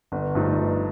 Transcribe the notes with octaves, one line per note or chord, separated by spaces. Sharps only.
G1
G2 F3 A3 D#4
G1